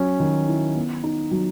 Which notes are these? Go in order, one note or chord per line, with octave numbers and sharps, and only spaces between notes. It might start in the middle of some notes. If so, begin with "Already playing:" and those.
Already playing: F#3 C#4
D#3
E4
B3
D#4
F#3